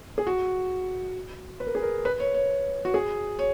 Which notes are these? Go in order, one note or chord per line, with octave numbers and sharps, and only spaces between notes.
G#4
F#4
B4
A#4
G#4
A#4
B4
C#5
C#5
F#4
G#4
C#5